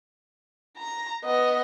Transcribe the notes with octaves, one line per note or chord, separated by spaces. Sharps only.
A#5
B3 D#5